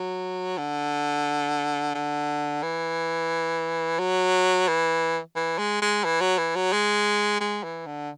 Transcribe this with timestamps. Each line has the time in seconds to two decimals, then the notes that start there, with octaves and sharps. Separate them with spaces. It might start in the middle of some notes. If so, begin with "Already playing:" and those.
Already playing: F#3
0.58 D3
1.95 D3
2.63 E3
3.99 F#3
4.68 E3
5.36 E3
5.58 G#3
5.82 G#3
6.05 E3
6.21 F#3
6.38 E3
6.56 F#3
6.73 G#3
7.41 G#3
7.64 E3
7.86 D3